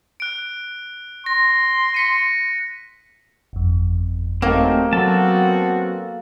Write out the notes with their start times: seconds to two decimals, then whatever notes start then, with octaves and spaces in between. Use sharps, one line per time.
0.20 F#6 D7
1.26 C6 A#6
1.94 B6 C#7 D#7
3.53 G1 F2
4.42 C3 F#3 A3 A#3 C4 D#4
4.93 F#3 B3 C4 F#4 A4 A5